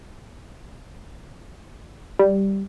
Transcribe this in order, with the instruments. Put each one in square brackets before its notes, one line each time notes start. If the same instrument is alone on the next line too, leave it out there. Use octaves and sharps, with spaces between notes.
[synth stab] G3